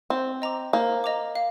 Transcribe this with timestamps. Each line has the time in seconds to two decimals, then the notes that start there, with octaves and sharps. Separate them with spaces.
0.10 C4 C5
0.42 D#5 A#5 D6
0.73 A#3 C5
1.04 D#5 A#5 D6
1.36 F5